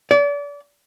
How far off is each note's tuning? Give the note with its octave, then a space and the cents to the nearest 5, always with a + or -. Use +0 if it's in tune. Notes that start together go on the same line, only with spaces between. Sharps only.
D5 -35